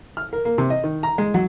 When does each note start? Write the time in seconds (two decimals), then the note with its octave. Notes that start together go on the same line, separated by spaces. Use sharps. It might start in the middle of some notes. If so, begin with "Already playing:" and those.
0.17 F6
0.33 A#4
0.45 A#3
0.58 C3
0.70 D#5
0.84 D#3
1.03 A#5
1.18 G#3
1.34 F#3